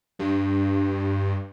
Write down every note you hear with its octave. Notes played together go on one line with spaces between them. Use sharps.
G2